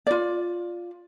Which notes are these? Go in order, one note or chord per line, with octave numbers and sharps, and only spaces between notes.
F4 D5